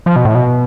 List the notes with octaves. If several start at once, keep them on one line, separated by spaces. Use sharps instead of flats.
F3
B2
A2
B2